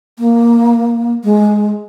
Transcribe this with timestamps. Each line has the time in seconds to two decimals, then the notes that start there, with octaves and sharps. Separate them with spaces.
0.19 A#3
1.24 G#3